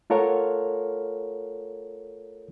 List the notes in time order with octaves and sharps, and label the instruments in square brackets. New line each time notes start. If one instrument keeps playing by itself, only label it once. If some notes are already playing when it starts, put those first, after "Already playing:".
[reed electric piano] A3 F4 A4 A#4 C#5 F#5